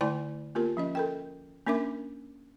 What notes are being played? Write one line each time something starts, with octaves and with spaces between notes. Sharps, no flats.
D3 A3 E4 D5 G#5 C6
A#3 B3 F4 G4 A#4
F3 C#4 D#5
A4 A#4 G5
A#3 C#4 D4 A#4 E5 D6